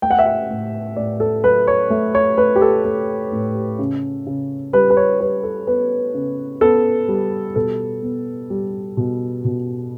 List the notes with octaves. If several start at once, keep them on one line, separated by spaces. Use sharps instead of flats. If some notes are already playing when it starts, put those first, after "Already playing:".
A3 G5
F#5
E5
F#5
A2
A2 D5
A4
F#3 B4
C#5
A3
C#5
A3 B4
G4
A4
A3 A4
A2
C#3
C#3
G3 B4
B4
C#5
G3 B4
A4
B3 B4
C#3
B3 A4
G3
B2 A4
B3
G3
B2
B2